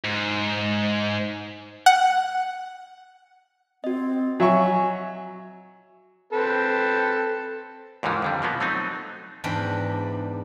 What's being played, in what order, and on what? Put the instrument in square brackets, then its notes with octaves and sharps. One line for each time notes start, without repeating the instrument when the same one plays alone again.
[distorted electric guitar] G#2
[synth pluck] F#5
[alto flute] C4 [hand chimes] F#4 D#5
[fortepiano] F#3 E5 C#6 [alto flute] G#5
[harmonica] C4 A4 B4
[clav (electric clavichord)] D#2 G#2 D3 E3 F3
F2 D3 G3
B2 F3 A#3 B3
F#3 A3 C4 D#4
[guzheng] E2 G#2 D4 G5 B5